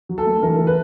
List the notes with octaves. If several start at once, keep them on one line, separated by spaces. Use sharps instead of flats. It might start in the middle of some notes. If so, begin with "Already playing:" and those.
F#3
A4
A3
E3 A#4
E3
B4